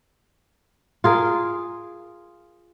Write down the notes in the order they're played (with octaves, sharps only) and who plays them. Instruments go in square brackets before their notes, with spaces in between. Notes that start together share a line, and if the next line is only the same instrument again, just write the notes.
[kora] F4 G#4 A#4